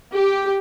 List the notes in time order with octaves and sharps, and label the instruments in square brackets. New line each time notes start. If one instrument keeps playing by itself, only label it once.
[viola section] G4